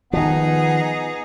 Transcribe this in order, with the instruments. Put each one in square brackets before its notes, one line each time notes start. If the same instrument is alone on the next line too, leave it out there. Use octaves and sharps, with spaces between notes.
[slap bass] D#3 F3 [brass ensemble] B3 [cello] D#4 G#4 [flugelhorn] F#5